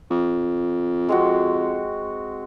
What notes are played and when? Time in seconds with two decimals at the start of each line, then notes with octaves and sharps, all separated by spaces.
0.11 F2
1.09 G#3 C4 F#4